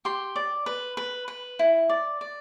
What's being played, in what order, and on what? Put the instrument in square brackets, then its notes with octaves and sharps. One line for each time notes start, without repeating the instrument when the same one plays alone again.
[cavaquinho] G4 C6
D5
B4
B4
B4
E4
D5
D5